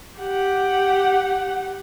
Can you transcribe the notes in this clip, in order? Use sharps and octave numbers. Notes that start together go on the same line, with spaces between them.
G4 F#5